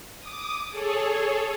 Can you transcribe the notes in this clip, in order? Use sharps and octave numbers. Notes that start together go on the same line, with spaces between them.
D6 D#6
G#4 A4 C#5